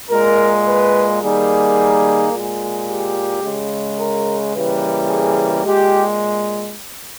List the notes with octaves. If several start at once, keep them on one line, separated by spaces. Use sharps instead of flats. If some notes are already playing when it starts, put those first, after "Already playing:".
A#2 G#3 A#4
B4
D#3 G3 A#3 G#4
A#2 G#3
G4
C#3 G#3
A#4
C#3 E3 G3 A#3 B4
G#4
A#2 G#3 G4